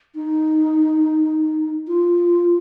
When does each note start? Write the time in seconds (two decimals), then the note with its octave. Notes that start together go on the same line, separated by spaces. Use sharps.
0.15 D#4
1.88 F4